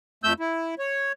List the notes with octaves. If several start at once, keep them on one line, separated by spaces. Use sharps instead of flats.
F2 A3 E6 G6
E4
C#5